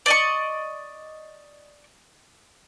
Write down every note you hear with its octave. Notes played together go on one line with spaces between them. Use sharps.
D5 D#5 C#6